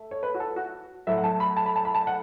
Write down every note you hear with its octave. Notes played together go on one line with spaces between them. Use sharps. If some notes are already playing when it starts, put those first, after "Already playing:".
Already playing: A3
C#5
B4
F#4
A4
F#4
A2 F#3 A3 E5
F#5
A5
B5
A5
B5
A5
B5
A5
F#5